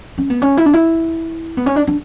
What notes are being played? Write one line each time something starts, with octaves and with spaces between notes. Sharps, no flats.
C#4
B3
C#4
E4
D4
E4
B3
C#4
D4
D4